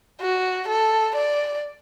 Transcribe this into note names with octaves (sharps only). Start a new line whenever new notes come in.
F#4
A4
D5